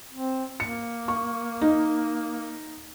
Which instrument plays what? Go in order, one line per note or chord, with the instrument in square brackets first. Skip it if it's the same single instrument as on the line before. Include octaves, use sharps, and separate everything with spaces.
[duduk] C4
[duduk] A#3 [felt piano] C#7
[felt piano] C#6
D#4